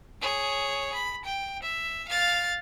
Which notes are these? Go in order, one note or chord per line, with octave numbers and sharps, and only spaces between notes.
G#4 C#5
B5
G5
E5
F5 A6